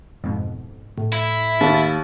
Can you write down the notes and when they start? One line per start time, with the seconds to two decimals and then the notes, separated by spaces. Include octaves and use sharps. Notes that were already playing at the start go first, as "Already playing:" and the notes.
0.24 F2 G#2 B2
0.98 A2
1.13 E4
1.61 D#2 A6